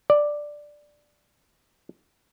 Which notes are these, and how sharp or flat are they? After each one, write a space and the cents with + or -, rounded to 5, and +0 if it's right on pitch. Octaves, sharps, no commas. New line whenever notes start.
D5 +5